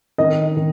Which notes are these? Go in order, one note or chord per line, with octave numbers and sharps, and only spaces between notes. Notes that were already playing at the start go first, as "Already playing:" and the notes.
D#3 D#5
D#3